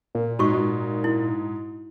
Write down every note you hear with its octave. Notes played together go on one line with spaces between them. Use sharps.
A#2
G#2 F#4 C#6
G#2
E4